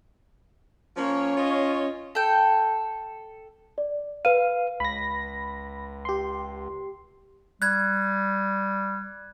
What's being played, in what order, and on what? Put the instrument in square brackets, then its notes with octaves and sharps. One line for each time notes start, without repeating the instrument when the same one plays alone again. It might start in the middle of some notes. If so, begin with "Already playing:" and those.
[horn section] F3 A#3 C#5 [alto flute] C#4
[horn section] F4 C#5 D#5
[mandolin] A4 G5
[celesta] D5
[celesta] B4 D#7 [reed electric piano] F5
[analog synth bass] C#2 [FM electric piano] B5 A#6
[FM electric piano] G4 C6
[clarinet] G3 [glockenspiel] F#6 G#6